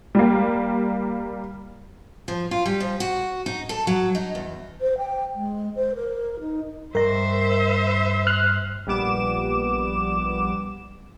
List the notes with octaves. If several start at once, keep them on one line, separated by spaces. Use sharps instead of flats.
G3 A#3
F3
F4
G3
F3
F#4
D#4
A4
F#3
D#4
E2
C5
G5
G#3
C5
A#4
D#4
G2 A#4 C5 D#5 E5
F6 F#6
A#1 G3 B3 D6 E7